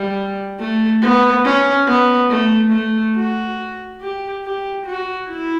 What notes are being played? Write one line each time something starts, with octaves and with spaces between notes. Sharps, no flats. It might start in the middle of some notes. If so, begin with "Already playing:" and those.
Already playing: G3
A3
B3
C#4
B3
A3
A3
F#4
G4
G4
F#4
E4